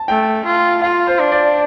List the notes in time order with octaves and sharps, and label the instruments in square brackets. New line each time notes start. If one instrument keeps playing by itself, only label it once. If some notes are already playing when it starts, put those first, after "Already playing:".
Already playing: [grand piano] A5
[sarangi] A3 [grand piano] G5
[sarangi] F4
[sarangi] F4 [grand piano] F5
[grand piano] C5
[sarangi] D4
[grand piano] D5